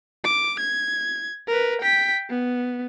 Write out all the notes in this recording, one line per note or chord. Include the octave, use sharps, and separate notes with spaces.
D6
G#6
A#4 B4
G5 B6
B3